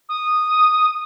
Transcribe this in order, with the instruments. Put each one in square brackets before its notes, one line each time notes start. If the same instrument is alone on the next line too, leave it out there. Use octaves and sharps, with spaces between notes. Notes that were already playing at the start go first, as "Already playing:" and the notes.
[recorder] D#6